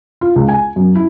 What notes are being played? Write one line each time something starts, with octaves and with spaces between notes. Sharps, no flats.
F4
C#2
G#5
F#2
E4